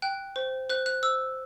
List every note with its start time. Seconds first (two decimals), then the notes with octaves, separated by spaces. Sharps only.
0.02 G5 F#6
0.36 C5
0.69 C5 F#6
0.86 F#6
1.03 C5 E6